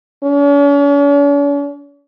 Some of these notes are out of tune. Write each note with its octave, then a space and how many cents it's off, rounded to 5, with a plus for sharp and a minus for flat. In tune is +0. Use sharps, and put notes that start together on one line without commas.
C#4 +45